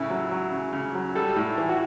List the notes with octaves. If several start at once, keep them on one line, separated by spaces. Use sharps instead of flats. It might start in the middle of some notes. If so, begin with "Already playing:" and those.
Already playing: A2 C#3 E4
F#3
F#3
C#3
C#3
F#3
G3 A4
A2
E3
F#4